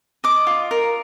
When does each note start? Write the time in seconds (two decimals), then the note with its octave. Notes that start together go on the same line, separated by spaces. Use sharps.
0.24 D#5 D6
0.47 F4
0.71 A#4